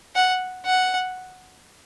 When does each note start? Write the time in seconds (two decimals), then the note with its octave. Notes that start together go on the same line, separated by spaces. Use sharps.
0.16 F#5
0.66 F#5